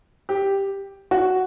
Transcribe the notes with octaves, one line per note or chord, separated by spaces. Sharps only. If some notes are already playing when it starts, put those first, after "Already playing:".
G4
F#4